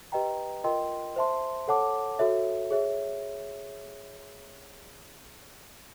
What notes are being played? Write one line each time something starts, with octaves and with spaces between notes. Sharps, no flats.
G4 B4 D#5 G5 A#5
F4 A#4 D#5 G5 C6
C5 E5 A5 C6
A4 C#5 F#5 A5 D6
F#4 A4 C#5 E5
G#4 C#5 E5